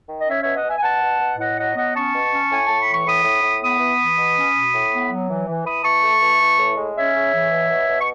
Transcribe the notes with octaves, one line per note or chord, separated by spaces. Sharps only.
D#3
D#5
C#4 C#5 E5
B2 C#5 E5
D#5 F#5
B2 E5 G#5
G#5
B2 F#5 A5
B2
B2
A2 D#5 F#5
F#3 D#5 F#5
B3 D#5 F#5
C#4 A5 C#6
B2
C#4
A2 G#5
A2 A5
B5
E3
C#6
A2 B5 D#6
A2
A2
B3 B5 D#6
E3
E3
B2
C#4
B2
A2
B3
F#3
E3
E3
E3 B5 D#6
E3 A5 C#6
A3
E3
E3
A2
G#3
C#4 C#5 E5
C#3
E3
B2
B2
B2
C#6